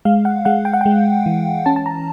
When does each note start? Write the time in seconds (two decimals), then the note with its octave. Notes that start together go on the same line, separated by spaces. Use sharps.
0.05 G#3 F5
0.25 F#5
0.45 G#3 F#5
0.65 G5
0.73 F#5
0.81 G#3 G5
1.26 E3
1.66 C#4 A5
1.76 A5
1.86 A#5